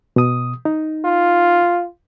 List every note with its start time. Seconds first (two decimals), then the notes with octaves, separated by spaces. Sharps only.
0.16 B2 D#6
0.65 D#4
1.05 F4